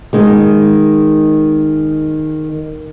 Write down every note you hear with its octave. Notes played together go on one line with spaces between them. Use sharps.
D#3 G#3